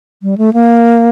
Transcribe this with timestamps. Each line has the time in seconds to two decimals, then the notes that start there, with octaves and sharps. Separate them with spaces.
0.22 G3
0.38 A3
0.53 A#3